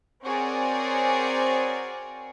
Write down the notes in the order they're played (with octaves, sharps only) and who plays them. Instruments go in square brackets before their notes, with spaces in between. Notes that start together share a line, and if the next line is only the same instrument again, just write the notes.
[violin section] C4 F#4 G#4 A#4 C#5 D5